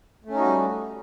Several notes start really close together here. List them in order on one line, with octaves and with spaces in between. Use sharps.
A3 C#4 D#4 F#4 G3